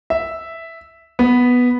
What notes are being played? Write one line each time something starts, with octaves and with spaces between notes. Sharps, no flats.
E5
B3